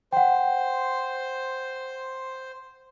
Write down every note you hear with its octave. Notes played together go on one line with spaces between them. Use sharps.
C5 F#5 G5